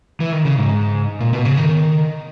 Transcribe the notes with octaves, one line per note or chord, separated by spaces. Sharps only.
E3
D#3
C#3
G#2
A#2
B2
C#3
D#3